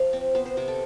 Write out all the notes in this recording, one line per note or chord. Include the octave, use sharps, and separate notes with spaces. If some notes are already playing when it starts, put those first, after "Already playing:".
Already playing: F3 F5
C4
B3 C5
C5
C3 C5
A4